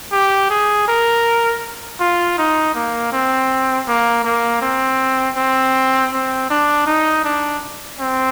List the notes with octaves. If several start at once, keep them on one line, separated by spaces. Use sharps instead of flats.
G4
G#4
A#4
F4
D#4
A#3
C4
A#3
A#3
C4
C4
C4
D4
D#4
D4
C4